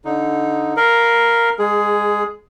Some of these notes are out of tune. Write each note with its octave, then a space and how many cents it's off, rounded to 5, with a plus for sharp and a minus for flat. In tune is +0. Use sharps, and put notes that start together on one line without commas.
D3 -10 D#4 +0
A#4 +0 F5 +0 B5 +10
G#3 -20 G#4 +10